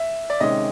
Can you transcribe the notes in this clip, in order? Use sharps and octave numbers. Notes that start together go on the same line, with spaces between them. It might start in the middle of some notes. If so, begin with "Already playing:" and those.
Already playing: E5
D5
C3 D#3 G#3 C#4 D#5